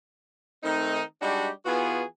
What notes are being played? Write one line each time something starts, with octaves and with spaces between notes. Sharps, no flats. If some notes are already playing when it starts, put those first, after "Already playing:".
D#3 A3 C4 D#4
G3 G#3 D4 D#4 F#4 G4
E3 B3 F4 F#4 G#4